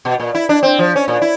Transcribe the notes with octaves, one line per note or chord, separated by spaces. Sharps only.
B2
A#2
E4
D4
C4
F3
C#4
A#2
E4